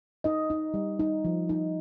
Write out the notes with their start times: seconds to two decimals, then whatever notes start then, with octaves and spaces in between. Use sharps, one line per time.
0.24 D#4 D#5
0.50 D#4
0.74 G3
0.99 D#4
1.25 F3
1.49 D#4